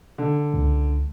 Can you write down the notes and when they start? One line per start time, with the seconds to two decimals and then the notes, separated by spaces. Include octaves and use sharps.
0.18 D3
0.54 C#2